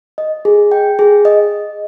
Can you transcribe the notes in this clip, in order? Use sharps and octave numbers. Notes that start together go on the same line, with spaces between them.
D#5
G#4
G5
G#4
D#5